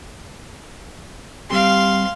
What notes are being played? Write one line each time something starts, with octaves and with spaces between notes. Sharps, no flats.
G3 C4 G4 F5 C6